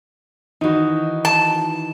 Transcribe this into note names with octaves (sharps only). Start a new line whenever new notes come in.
D#3 E3 D#4 F#4
A5